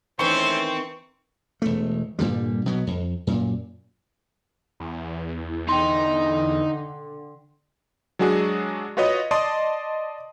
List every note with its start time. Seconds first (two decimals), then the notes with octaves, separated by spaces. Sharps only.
0.19 D#3 E3 A3 C4 C#4 C5 C#6
1.62 E1 A3
2.19 G2 A#2 D3 G3
2.66 B2 F#3 B3
2.87 F2
3.27 F#2 A#2
4.80 E2
5.69 D3 D#4 G5 C6
8.19 F#3 G#3 D4 F#4 G#4
8.97 F4 F#4 B4 C#5 D#5 D#6
9.31 D5 D#5 A5 C6 D#6